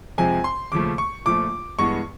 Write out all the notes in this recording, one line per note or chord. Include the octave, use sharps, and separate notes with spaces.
F2 C3 F3 G#3 C4 G#5
C6
D#2 C#3 F3 A3 D6
C#6
A#1 A#2 F3 A3 D6
G2 E3 G#3 B3 C#6